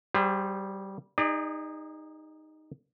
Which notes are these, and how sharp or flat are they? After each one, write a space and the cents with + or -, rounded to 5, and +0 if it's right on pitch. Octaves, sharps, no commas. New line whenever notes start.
G3 -15 G#4 -45 C5 +0
D#4 +0 G#4 -35 D5 +30